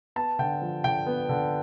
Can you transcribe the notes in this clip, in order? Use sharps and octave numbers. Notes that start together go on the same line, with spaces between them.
B3 A5
D3 G5
F3
D3 G5
B3
D3